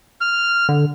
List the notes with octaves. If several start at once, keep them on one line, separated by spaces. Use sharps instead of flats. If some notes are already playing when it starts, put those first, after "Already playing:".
F6
D3